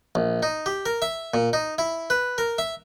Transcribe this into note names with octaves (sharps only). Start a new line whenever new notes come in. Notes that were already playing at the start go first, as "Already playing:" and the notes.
A#1
D#4
G4
A#4
E5
A#2
D#4
E4
B4
A#4
E5